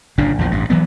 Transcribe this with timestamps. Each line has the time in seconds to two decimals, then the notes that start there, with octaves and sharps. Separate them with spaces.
0.18 G1 A#2 C#3 D4
0.38 A#1 E2 F3
0.51 A1 G2
0.70 E3 F#3 B3